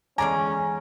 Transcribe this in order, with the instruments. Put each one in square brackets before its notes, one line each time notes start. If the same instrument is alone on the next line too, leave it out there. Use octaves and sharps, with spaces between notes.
[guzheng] E2 G#3 D5 [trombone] C#4 [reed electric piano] G#5 [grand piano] A#5